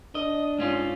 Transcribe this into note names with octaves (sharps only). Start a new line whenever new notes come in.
D4 D#5
G#2 C#4 F4